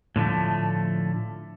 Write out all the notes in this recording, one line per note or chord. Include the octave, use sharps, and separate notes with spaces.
A2 D3 F3 A3